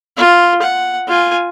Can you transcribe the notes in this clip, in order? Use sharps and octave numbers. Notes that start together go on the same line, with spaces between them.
F4
F#5
F4 G#5